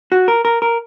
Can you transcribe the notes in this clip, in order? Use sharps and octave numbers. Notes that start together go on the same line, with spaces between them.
F#4
A#4
A#4
A#4